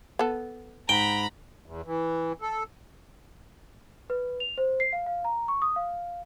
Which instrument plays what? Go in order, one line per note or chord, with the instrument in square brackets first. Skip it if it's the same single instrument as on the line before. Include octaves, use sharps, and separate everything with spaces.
[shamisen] B3 A4
[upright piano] G#2 [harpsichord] G5 [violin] A#5 B5
[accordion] E2
E3
A4
[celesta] B4
F7
C5
C7
F5
F5
A#5
C#6
D#6
F5